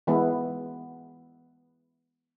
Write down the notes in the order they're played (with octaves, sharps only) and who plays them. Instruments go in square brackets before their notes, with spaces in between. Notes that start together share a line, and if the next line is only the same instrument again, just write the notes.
[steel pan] E3 G#3 B3 E4